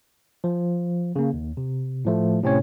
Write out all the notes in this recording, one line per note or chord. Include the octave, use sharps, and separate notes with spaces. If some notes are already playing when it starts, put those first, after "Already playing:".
F3
C#3 A#3
D#2
C3
A2 F3 A3
A2 C3 C4 C#4 C#5